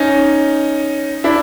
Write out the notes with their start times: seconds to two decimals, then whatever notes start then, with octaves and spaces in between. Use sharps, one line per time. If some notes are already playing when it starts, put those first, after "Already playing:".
Already playing: C#4 D#4
1.24 D4 E4